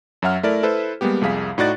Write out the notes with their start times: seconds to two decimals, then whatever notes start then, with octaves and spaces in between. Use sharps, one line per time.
0.22 F#2 F#3 E5 F#5 F6
0.43 A3 E4 A4 A#4 D5
0.63 E4 A4 B4 C5
1.01 G3 G#3 A#3 B3 G4
1.21 C2 F2 G#4 F5 B6
1.58 A2 D#4 F#4 D5 F#6 A6